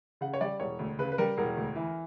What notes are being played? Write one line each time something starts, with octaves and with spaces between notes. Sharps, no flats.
C#3 F#5
C#5
G3 D5
E1 C#5
D2
C#3 B4
B4
G3 A#4
E1 A#4
D2
E3